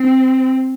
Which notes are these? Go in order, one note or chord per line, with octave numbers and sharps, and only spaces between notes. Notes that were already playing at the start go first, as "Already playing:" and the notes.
Already playing: C4